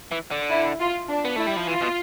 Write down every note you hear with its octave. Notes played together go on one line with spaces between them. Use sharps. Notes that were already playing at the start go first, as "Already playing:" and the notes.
E3
D3
E4
F4
D4
B3
A3 E4
G3
F3
E3 F4
B2